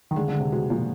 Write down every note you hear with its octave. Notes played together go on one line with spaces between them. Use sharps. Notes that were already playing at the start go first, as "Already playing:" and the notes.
D#3
D3 G#3
D3
G#3
C3
B2 G#3
A#2 F3